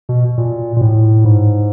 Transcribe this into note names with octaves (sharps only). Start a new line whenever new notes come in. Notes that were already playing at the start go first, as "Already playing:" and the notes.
B2
A#2
A#2
A2
G#2